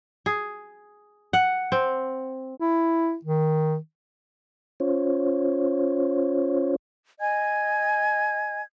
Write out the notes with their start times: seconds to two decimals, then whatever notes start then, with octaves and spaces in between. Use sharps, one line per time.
0.26 G#4
1.33 F#5
1.72 C4
2.60 E4
3.25 D#3
4.80 C#4 F4 C5 C#5
7.20 D#5 G#5 G#6